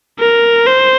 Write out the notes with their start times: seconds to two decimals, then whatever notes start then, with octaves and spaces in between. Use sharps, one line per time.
0.19 A#4
0.67 C5